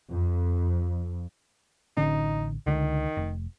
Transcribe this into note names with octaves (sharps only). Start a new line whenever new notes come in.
F2
A1 D3 C#4 D#4
C#2 D3 D#3
F1